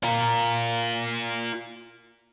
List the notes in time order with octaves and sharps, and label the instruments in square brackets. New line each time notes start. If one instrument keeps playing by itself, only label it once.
[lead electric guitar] F4 A#4